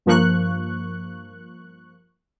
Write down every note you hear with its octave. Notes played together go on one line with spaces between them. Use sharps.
G2 F3 A#3 C#6 F#6